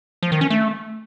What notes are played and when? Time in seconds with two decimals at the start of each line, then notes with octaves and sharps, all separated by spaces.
0.23 F3
0.32 D#3
0.41 C#4
0.50 A3